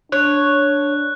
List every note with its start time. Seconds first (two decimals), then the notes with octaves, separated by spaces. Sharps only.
0.12 D4 C#5 F#6